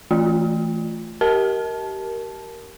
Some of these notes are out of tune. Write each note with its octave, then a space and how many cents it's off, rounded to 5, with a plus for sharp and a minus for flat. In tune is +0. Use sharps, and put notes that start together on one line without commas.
E3 +0 A3 +0 F4 +0
G4 -20 A#4 +0 A5 -15